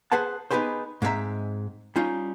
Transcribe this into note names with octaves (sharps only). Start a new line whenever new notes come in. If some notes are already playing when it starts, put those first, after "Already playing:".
G#4 B4 C5 F#5 A5
B3 D#4 G4 G#4 B4 C5
G#2 G#3 C4 C#4 E5 A#5
G3 C#4 D#4 F4